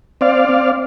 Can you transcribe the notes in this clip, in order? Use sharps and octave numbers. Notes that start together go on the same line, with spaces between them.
C4 D5 F5
C4